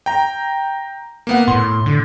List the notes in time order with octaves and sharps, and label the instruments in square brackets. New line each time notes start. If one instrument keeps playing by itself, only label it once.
[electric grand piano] G5 A#5
A#3 B3 F#5
[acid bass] A2 [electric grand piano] C6
[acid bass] D3